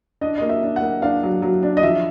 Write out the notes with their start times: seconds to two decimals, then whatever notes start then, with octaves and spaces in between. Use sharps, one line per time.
0.21 D4 D#5
0.38 A#3 D#5
0.49 E5
0.62 D4
0.76 F#5
0.82 A#3
1.02 D4 F5
1.23 F#3
1.42 F#3
1.63 D4
1.77 D#5
1.83 F3 E5